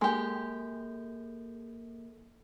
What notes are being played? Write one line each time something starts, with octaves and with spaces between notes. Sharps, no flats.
G#3 A#3 G4 A4